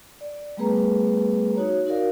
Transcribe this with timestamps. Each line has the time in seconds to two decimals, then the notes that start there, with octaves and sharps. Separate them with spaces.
0.21 D5
0.57 G3 A3 B3 G#4 B4 A#5
1.56 D#4 F#4 C#5
1.86 D#4 F#4 A#4 D5 F5